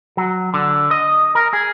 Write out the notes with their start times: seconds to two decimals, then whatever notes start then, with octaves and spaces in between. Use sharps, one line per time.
0.17 F#3
0.54 D3
0.91 D#5
1.35 A#4
1.53 G#4